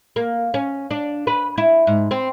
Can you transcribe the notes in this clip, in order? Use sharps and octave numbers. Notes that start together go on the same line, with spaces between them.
A#3
C#4
D4
B4
E4
G#2
C4